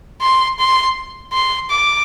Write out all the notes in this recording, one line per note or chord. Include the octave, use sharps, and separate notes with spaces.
C6
C6
C6
D6